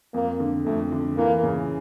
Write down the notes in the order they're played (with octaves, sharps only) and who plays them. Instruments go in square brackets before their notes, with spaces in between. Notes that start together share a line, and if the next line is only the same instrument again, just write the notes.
[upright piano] F2 [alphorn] A#3
[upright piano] D3
[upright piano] F2 [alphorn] A3
[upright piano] D3
[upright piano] E3 [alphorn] A#3
[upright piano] C#3